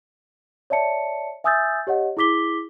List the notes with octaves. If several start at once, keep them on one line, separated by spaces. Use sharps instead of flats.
C#5 D5 E5 A5 C#7
E5 G#5 D#6 E6 G6 A6
G4 C#5 D#5 F#5
E4 G#4 D6 B6 G7